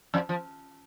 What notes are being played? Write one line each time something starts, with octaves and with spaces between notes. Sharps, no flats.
F2 F3
F3